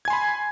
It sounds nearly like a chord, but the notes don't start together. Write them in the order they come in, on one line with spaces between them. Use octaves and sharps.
G#6 G#5 C6 B5